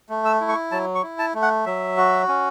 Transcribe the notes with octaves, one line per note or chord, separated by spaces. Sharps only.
A3
E6
E4
C#6
F#3 A5
C#6
E4
A5
A3
F#5
F#3 E5
F#4
C#4